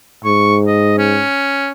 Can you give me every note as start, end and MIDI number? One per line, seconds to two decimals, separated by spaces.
0.25 1.23 44
0.25 0.57 85
0.67 0.98 75
0.98 1.72 61